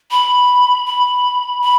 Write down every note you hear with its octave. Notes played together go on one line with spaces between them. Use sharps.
B5
B5
B5